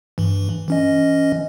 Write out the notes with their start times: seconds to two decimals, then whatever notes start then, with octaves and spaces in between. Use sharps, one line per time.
0.18 G2 E3
0.68 E3 C#4 D#5